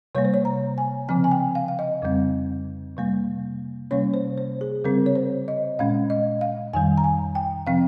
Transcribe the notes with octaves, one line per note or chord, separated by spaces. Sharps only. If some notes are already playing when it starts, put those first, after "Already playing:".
C3 G3 A#3 C#5
C5
C#5
A#5
G#5
C#3 F3 C4 G#5
G#5
G5
F5
F5
D#5
F2 C#3 G3 C4
C3 G3 A#3
C3 G3 A#3 C#4 C#5
C5
C5
G#4
C#3 G3 C4 A#4
C#5
C5
D#5
A#2 G#3 C#4 F5
D#5
F5
F2 D#3 G3 G#5
A#5
G#5
G5
C3 F3 C4 F5